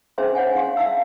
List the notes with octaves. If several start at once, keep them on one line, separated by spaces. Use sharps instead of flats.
C#4 D4 G#4 C5 E5 C6
C5 C#5 F#5 G#5
D4 F5 F#5 C6
D4 E5 F5 A5 E6